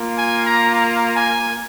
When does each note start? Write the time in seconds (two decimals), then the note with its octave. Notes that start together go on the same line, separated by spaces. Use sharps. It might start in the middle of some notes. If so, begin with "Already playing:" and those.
Already playing: A#3 F4
0.16 G#5
0.45 A#5
0.74 A#5
1.16 G#5